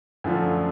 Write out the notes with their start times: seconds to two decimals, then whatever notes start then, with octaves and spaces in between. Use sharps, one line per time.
0.24 F#2 D3 F3 A3 D4